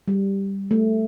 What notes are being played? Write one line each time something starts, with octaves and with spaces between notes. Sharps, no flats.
G3
A3